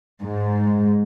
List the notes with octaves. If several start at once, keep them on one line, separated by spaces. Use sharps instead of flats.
G#2